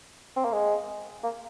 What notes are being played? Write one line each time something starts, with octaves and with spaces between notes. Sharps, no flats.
C4
A#3
G#3
A#3